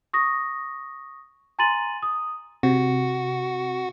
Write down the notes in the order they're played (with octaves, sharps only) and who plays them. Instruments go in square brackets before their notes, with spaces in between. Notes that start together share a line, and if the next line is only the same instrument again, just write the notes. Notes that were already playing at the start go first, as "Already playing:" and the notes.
[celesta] C#6 D#6 A#6
G#5 A#5 C6 A6 D#7 F#7
D#6
[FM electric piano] C3 [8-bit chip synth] F#4